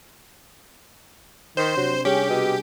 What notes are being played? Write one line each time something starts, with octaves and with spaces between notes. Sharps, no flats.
D#3 C5
C3 F#3 D4 G4
G3 C#4 G4 G#4
B2